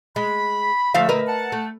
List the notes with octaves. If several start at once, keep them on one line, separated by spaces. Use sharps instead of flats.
G#3 B5
A#2 D3 F3 A3 E5 F5
A#4 B4 D#5
F#5 A5
A3